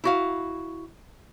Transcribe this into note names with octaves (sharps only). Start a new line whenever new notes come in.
E4 F#4 F5